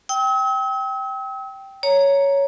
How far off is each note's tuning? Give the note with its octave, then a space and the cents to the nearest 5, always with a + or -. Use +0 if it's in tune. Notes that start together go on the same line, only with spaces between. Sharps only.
G5 -10 E6 -45
C#5 +5 A#5 +0